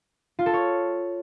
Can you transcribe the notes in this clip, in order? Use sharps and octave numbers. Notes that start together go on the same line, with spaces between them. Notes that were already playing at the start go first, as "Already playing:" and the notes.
F4
A4
C#5